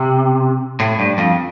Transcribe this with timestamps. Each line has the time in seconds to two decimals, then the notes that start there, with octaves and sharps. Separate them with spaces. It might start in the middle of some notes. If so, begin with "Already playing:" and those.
Already playing: C3
0.80 A2
0.99 G2
1.18 F2